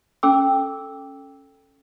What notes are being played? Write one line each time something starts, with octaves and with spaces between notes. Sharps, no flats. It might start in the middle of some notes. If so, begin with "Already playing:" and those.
C#4 A4 G5 D6 E6